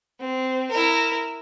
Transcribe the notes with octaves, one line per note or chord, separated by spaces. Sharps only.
C4
E4 A#4